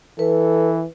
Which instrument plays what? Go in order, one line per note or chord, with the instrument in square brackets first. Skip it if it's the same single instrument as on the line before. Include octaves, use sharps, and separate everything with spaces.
[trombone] E3 [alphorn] A4 [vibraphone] B4